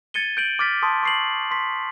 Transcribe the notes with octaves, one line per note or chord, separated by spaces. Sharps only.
G#6 A6 C#7 D#7 G7
G6 D7 F#7
D6 F6 A6 B6
A5 C6 D#6
C#6 C7 F#7
C6 B6